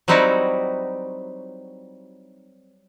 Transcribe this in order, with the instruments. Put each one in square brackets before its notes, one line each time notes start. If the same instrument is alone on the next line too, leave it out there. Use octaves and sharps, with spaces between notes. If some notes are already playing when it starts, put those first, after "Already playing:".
[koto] F#3 G3 C4 D#4 E4 F#4